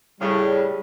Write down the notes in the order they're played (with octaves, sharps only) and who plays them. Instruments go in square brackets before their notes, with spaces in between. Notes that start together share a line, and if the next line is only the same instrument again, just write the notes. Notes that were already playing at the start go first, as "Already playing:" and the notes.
[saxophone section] A2 C#3 [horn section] G3